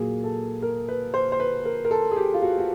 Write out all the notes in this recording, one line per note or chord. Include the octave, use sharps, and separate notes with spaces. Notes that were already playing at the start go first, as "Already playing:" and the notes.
Already playing: A#2 F#3 A#3 G#4
A4
A#4
B4
C5
C5
B4
A#4
A#4
A4
G#4
G4
F4
F#4
F#4